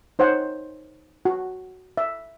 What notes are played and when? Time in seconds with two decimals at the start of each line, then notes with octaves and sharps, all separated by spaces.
0.19 D#4 C5 C#5 F#5
1.25 F#4
1.97 E5